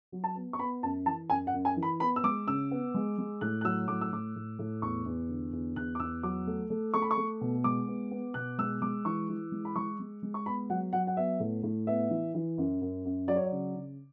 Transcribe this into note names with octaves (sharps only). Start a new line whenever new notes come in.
F#3
A5
B3
C#6
B3 B5
F#2 A5
E3 A5
F#2 G#5
F#5
F#2
G#5
E3
B5
B3 B5
E6
G#3 D6
C#3 E6
B3
G#3
G#3
A2 F#6
F#6
F#3 E6
A2 D6
E6
A2 D6
A2
A2
E2 C#6
E2
D3
E2
E2 F#6
D6
E2 E6
F#3 D6
A3
A3
A3 C#6
B5
C#6
A3
B2
G#3 D6
B3
B3
B2 F#6
G#3 E6
G#3 D6
E3 C#6
E3
G#3
B5
G#3 C#6
G#3
G#3
C#6
B3 B5
F#3 F#5
F#3 F#5
F#5
B3 E5
A2
A2
B3 E5
E3
E3
F#2
F#2
F#2
F#3 D5
C#5
D5
C#3
C#3